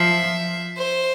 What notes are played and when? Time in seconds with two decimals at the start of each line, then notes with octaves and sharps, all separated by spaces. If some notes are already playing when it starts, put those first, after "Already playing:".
Already playing: F3 E5
0.78 C5